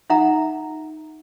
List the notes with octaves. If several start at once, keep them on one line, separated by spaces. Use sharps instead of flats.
D#4 F4 E5 F#5 A#5